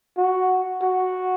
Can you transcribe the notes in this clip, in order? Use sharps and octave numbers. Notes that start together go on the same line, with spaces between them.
F#4
F#4